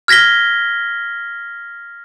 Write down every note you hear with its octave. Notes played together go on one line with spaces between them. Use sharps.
F6 G#6 A#6 B6 G7